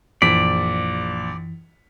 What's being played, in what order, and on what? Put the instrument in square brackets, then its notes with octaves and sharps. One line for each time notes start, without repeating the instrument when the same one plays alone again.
[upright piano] A#1 B6 [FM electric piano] F#2 E3 [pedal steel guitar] D5